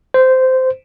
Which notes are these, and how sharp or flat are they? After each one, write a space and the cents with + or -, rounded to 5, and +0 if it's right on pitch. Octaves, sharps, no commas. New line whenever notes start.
C5 -15